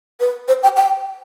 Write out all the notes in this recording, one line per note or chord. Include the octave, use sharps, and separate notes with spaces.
B4
C5
G5
G5